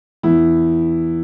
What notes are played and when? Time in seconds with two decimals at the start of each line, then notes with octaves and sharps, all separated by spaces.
0.23 E2 E4